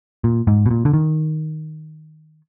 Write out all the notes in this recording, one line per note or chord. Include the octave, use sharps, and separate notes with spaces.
A#2
G#2
B2
A#2
D3
D#3